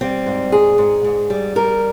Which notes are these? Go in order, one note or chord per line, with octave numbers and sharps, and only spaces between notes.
G3 C4
G#2
G#2 G#4
G#2
G#2
G3
G3 A#4